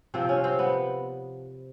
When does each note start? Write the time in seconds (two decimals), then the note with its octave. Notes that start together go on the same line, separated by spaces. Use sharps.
0.14 C3 F3 C4
0.29 C#4
0.44 C4
0.59 B3